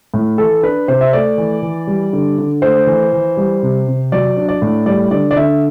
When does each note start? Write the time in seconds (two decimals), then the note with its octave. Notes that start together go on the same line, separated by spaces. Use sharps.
0.14 A2
0.38 E3 A4
0.63 D4 B4
0.88 C3 C5
1.01 E5
1.13 A3 D5
1.38 E3
1.62 E3
1.87 G3
2.13 D3
2.38 D3
2.62 A3 C5
2.87 E3
3.13 E3
3.37 G3
3.63 C3
3.87 C3
4.12 F#3 D5
4.37 D4
4.49 D5
4.62 A2
4.86 G3 D5
5.11 D3 D5
5.31 D5
5.36 D3 E5